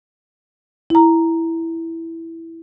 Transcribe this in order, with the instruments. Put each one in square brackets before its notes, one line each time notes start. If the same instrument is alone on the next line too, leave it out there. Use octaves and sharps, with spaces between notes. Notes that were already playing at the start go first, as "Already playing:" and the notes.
[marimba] E4 A#5